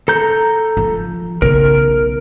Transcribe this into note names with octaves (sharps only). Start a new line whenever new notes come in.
A4 A#5 G6
F3
B1 C#3 A#4